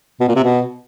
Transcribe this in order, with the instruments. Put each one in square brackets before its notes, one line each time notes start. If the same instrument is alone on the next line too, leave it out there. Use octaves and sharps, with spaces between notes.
[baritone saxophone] B2
A#2
C3
B2